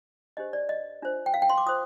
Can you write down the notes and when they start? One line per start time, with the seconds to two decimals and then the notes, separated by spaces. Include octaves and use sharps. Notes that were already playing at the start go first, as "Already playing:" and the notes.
0.37 D4 G4 C5 D#5
0.53 D5
0.69 D#5
1.02 D4 F4 C5
1.26 G5
1.34 F5
1.42 G5
1.49 C6
1.58 D6
1.66 F4 C5 D#6